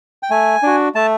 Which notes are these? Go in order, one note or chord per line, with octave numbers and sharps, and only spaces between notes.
G5
A3 G#5
D4 F#4
A3 A5